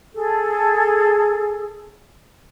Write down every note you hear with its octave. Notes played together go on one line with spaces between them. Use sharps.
G#4 A4